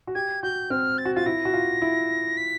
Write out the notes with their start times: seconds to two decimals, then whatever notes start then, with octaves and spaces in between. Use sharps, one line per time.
0.07 F#4
0.14 G4 G#6
0.42 F#4 G6
0.70 C4 F6
0.98 A6
1.05 F#4
1.15 F4 A6
1.26 E4 A#6
1.45 F#4
1.54 F4
1.82 E4
2.37 B6